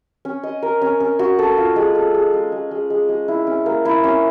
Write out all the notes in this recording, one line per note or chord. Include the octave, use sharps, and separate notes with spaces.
C#4
D#5
A#4
C#4
C#4
F#4
A4
F4
G#3
A4
G#3
G#3
G#3
G#3
G#3
G#3
E4
C#4
A#3
E4
C#4